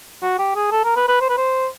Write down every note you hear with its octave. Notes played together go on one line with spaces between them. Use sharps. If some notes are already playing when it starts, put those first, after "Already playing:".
F#4
G4
G#4
A4
A#4
B4
B4
C5
B4
C5